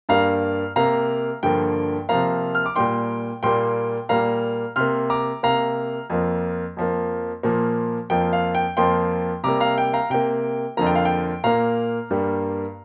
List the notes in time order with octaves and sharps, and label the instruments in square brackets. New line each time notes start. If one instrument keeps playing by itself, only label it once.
[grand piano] G2 G3 A#3 F5 A#5
C3 A#3 F5 A#5
G2 D3 F3 A#3 G5
C3 F3 A#3 F5 A#5
F6
D6
A#2 G3 A#3 G5 C6
A#2 G3 A#3 G5 C6
A#2 G3 A#3 F5 A#5
C3 A#3 C6 F6
A#5 D6
C3 A#3 F5 A#5
F2 F3 A#3
F2 F3 A#3
A#2 F3 A#3
F2 F3 A#3 G5
F5
G5
F2 F3 A#3 G5 C6
C3 G3 A#3 A#5 D6
F5 A#5
G5
F5 A#5
C3 A#3 G5
F2 D3 F3 A#3 A#5
G5
F5
G5
A#2 A#3 F5 A#5
G2 G3 A#3